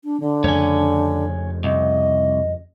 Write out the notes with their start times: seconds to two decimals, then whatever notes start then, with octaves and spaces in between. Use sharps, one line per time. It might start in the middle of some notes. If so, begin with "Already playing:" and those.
0.04 D4
0.20 D3
0.44 F2 C#3 A3 C#5 G#5
1.64 C2 D#5